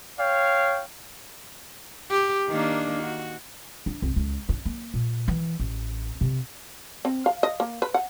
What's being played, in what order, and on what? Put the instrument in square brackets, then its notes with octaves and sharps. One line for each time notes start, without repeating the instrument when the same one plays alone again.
[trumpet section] C#5 F5 G5
[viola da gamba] G4
D#3 A#3 D4
F#4
[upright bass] D4
C2
C#2
D4
A#3
A#2
E3
A1
C3
[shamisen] C4
F5
D#5
A#3
B4
F#5